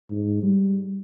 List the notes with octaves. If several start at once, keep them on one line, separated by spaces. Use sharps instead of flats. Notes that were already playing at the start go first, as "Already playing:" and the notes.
G#2
G3